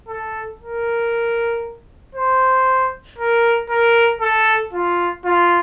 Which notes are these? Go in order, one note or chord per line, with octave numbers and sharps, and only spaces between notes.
A4
A#4
C5
A#4
A#4
A4
F4
F4